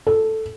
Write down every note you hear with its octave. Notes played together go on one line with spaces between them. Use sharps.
A4